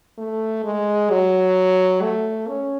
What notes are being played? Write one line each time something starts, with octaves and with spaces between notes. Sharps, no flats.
A3
G#3
F#3
A3
C#4